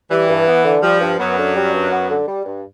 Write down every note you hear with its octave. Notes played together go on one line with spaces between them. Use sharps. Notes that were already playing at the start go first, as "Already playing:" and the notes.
E3 G3
G2
B3
D3
F3 G3
G2
F#2 F#3 B3
D3
G3
G2
B3
D3
G3
G2